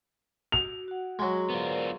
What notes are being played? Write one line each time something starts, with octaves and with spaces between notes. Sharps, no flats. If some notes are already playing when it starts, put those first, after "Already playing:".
F#4 F7
F#4 F#5
F#3 G#3 F#4
B3 F4 A#4 C5 D5